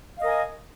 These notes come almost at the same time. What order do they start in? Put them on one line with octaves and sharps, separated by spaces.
F5 D#5 A#4 G#5